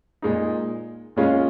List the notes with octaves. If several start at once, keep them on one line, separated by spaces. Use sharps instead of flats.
A#2 G#3 D#4
A#2 G#3 C#4 F4